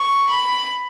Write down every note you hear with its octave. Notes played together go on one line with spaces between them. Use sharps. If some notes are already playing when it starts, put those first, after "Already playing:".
Already playing: C#6
B5